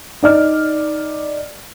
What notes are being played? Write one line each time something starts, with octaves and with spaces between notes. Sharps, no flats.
D#4 D5 F6